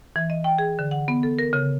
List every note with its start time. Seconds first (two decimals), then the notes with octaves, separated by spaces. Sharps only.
0.16 E3
0.30 D#5
0.44 G5
0.58 G#4
0.79 D3
0.91 F#5
1.08 B3
1.23 A4
1.39 A#4
1.53 C#3